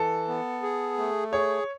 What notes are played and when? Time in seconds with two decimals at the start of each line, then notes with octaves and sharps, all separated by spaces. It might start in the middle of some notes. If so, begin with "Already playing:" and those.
Already playing: E3 A4
0.28 B3
0.62 G#4
0.98 A3
1.32 G#4 C#5